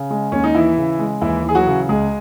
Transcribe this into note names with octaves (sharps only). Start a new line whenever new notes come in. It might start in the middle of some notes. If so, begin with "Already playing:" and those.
Already playing: C#3
G#3
D#2 C#4
D#4
E3 E4
C#3
G#3
D#2 E3 E4
E3 G#4
F#3 F#4
C#3
C#2 G#3 G#4